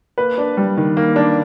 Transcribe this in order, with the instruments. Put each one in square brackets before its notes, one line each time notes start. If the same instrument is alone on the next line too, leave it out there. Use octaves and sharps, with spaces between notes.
[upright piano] A#3 B4
D4
G3
D#3
A#3
D4